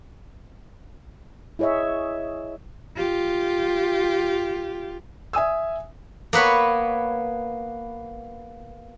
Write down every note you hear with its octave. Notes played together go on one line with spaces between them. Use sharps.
E4 G#4 C#5 D#5 E5
F4 G4
E5 G#5 D#6 E6
A#3 B3 B4 C#5